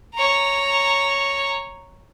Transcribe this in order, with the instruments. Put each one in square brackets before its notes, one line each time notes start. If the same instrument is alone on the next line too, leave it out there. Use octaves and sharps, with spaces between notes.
[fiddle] C#5 A#5